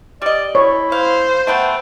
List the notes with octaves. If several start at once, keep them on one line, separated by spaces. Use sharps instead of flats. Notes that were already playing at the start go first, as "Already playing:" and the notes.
G3 D5 D#5
E4 C#5
C5 F5
A3 B3 F#5 G5